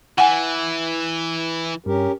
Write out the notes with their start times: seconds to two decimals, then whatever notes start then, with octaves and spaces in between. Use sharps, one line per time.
0.18 E3 F#5 G#5
1.86 G2 C#4 G4 A#4